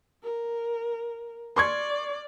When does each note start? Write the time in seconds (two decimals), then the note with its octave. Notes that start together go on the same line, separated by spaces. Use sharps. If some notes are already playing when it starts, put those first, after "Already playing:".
0.23 A#4
1.56 D5 C6 C#6 G#6